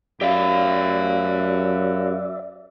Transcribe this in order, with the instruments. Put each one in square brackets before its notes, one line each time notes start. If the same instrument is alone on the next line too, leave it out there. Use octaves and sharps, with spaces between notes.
[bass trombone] F#2 [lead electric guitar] G4 F5 [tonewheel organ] D5 E5